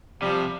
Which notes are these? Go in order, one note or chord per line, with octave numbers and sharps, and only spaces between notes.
C3 F3 G3